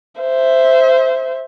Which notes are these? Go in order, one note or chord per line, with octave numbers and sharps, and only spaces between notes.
C5 E5